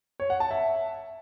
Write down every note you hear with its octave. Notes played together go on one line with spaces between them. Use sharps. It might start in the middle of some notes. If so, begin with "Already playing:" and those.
C#5
F#5
A5
E5